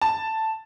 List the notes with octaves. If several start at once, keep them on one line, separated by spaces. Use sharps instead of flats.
A5